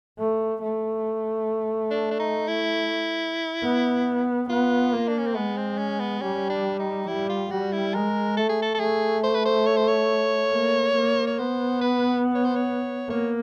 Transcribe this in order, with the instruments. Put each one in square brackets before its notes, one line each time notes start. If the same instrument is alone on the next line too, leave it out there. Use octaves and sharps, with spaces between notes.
[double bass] A3
A3
[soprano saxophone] D4
D4
D#4
E4
[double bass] B3
[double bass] B3 [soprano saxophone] F4
[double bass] A#3
[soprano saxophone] D4
C#4
C4
[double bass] G#3 [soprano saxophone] B3
[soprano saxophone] C4
C#4
B3
[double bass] G3 [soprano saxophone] C#4
[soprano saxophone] D4
D#4
[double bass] G3 [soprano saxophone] E4
[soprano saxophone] F4
[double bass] G3 [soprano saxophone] F#4
[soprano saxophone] E4
[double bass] G#3 [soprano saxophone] A#4
[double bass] A3 [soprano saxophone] A4
[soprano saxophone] G#4
A4
A4
[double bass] A3 [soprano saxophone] G#4
[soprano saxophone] C5
B4
C5
C#5
C5
C#5
[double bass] A#3
A#3
[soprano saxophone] C#5
[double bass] B3 [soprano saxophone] C5
[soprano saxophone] B4
C#5
C5
C#5
[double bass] A#3 [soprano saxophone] C#5